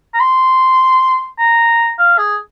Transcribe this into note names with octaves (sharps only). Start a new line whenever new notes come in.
A#5
C6
A#5
F5
G#4